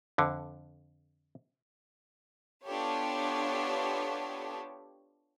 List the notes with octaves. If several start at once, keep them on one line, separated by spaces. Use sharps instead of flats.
F2 D3
B3 D4 F4 G4 A4 C#5